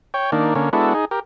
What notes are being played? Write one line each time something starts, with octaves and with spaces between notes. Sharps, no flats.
C#5 G5
D#3 A#3 D4
D3 A#3 C#4
G#3 B3 D4 E4 F#4 A4
D#4 G#4
G4 A#4